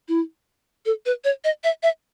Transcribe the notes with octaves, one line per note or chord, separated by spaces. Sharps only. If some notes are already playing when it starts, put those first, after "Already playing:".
E4
A4
B4
C#5
D#5
E5
E5